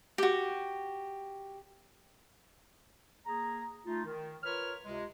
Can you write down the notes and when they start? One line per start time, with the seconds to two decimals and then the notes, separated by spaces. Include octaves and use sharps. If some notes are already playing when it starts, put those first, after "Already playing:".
0.18 F#4 G4
3.26 A#3 G#4 A#5
3.86 A3 D#4 F4
4.05 D#3
4.43 F4 A#4 B4 C#5 F6
4.85 C#2 C3 G#3